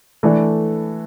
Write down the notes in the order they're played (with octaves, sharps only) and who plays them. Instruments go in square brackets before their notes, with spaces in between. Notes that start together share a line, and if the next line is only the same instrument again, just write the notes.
[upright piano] E3 A3 D4 A4